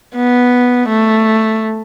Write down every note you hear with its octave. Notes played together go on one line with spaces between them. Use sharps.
B3
A3